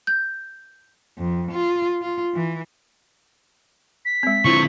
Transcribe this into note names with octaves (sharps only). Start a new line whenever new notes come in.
G6
F2
F4
F4
E3
B6
G#3 C4
D3 C4 E4 F4 C#6